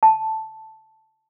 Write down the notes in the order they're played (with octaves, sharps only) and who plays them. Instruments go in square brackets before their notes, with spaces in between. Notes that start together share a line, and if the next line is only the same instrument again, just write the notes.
[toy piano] A5